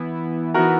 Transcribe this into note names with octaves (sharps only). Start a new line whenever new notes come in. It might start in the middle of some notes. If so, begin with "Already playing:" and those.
Already playing: E3 B3 E4
E3 B3 E4 F#4 A#4